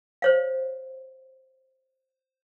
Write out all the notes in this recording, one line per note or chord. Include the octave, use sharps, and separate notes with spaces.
C5 C#5 F5